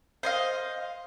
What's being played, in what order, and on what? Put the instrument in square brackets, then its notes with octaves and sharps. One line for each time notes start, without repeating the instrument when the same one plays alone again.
[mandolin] C5 D#5 F5